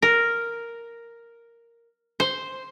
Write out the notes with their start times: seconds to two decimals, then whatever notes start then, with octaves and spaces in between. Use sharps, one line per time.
0.02 A#4
2.20 C5